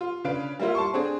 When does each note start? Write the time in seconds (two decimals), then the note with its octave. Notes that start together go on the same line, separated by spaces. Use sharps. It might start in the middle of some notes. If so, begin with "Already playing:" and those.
0.01 F4
0.24 C#3 D4 B4 F5 D7
0.60 G3 A#3 E4 F4
0.75 A5 C6 C#6
0.94 C4 D4 G#4